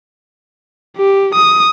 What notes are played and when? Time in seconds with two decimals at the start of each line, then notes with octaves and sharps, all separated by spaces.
0.97 G4
1.35 D#6